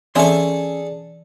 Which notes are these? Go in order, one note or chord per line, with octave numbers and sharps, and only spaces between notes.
E3 C4 C#4 G#4 A4 D5 E5 C6